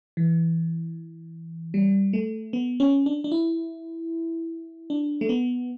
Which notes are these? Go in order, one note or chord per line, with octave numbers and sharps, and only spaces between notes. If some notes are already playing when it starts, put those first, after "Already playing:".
E3
G3
A3
B3
C#4
D4
D4
E4
D4
A3
B3